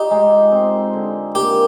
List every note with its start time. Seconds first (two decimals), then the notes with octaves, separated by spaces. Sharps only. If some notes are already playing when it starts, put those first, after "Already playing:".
Already playing: D#4 F4 G4
0.11 G#3
0.52 C4
0.93 D3
1.35 A#3 G4